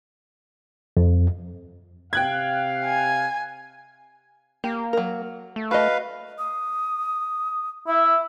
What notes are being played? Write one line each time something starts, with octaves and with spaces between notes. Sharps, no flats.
F2
C3 F5 G5 F#6 G#6
G#5
A#3 G4
F#3 A#4
A3
F#4 B4 D#5 F5
D#6
E4 E5